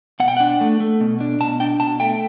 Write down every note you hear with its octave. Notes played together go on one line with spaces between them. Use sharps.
B2 F#5
G5
D4 F#5
A3
A3
B2
D4
B2 A5
D4 G5
B2 A5
A3 G5